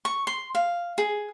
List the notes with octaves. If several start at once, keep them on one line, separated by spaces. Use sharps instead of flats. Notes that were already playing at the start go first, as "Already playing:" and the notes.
C#6
C6
F5
G#4